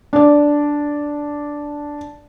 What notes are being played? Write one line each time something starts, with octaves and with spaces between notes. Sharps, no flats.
D4 D5